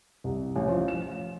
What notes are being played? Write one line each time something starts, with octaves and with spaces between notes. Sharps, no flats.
C2
A1
F3
E7